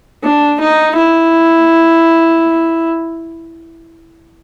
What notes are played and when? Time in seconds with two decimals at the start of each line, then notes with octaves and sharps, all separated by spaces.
0.24 D4
0.60 D#4
0.96 E4